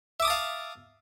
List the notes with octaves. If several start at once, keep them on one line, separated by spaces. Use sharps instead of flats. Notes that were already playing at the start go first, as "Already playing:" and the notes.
E5 F5 A5 D6 D#6